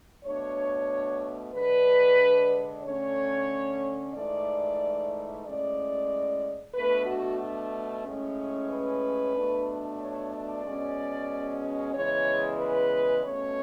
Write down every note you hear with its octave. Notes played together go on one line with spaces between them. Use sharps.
B2 A3 D4 C#5
D3 G#3 D4 B4
D3 A3 C#4 C#5
G#2 E3 A3 D5
A2 G#3 C#4 D5
B2 A3 D4 B4
F#4
A2 G#3 C#4
B4
B2 A3 D4
C#5
D5
B2 G#3 C#4
E2 C#3 E3 G#3 C#5
B4
B2 A3 C#4 C#5